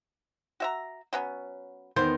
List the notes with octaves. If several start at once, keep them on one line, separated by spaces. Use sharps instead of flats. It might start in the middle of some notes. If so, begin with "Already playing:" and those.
F#4 E5 A#5
F#3 B3 C#4
E2 D#3 B3 C5